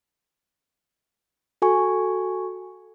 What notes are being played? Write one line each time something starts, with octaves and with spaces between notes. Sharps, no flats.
F#4 A4 G#5 C#6